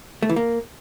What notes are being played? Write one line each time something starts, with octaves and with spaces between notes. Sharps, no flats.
A3
E3
A#3